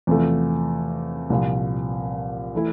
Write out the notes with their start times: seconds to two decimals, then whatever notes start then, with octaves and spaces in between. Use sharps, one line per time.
0.07 E2 C3 F3 A3
1.30 C2 A#2 F3
2.55 E3 A3 E4